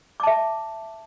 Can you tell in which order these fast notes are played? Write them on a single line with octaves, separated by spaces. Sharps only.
D6 A5 E5